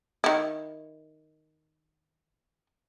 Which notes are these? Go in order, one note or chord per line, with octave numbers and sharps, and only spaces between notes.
D#3 E4